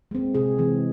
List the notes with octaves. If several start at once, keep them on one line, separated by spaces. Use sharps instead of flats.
G#3 C4
C3 G#4
E3 G#3 C4